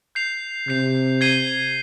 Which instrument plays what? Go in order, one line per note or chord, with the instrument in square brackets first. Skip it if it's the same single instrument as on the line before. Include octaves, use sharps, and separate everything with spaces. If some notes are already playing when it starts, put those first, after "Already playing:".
[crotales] G6 C7 F7
[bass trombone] C3 [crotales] G6 C7 F7
[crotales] G#6 C7 D#7 G7